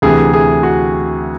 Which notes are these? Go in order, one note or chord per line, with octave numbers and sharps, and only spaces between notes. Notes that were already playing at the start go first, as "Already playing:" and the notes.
D2 C3 E3 A3 G#4
G#4
F#4